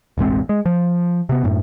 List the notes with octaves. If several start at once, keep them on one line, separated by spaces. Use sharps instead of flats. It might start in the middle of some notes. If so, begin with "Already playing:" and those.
E1 A1 G#3 C4
G#3
F3
C3 B3
F#2 A2